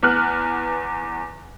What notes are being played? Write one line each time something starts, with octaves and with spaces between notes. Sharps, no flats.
E2 B3 F6 F#6